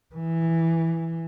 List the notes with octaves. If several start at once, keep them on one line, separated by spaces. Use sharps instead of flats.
E3